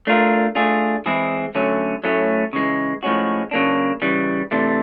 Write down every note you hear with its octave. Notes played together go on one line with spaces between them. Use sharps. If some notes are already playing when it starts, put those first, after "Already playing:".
A3 D4 F4 A#4
A3 D4 F4 G#4
E3 G#3 C4 E4 G#4
D3 F#3 A3 C#4
A2 F#3 A3 C#4
C#3 E3 G#3
A2 F3 G#3 C#4 F#4
C#3 F#3 A#3 D4
C#3 E3 G3
C3 E3 A3 D4